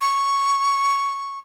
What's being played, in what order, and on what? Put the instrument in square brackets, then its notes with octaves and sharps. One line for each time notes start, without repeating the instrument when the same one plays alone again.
[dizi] C#6